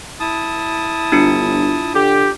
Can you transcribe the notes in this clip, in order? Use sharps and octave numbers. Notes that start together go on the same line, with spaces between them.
E4 A5 D#6
G1 D4 F4 C#7
D3 G4